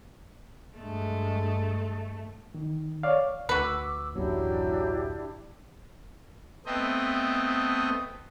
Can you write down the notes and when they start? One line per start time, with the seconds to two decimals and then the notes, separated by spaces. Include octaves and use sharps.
0.78 G2 G#3 A3
2.55 D#3
3.03 C#5 D5 F5
3.49 D2 F#4 B4 D6 E6
4.15 D1 A1 F#2 F#3 D4 E4 G4
6.66 A3 B3 C4 D#5 G5